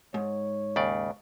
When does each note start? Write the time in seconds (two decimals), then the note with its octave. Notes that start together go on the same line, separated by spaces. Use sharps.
0.14 G#2 C#5
0.76 D#2 C#3 D5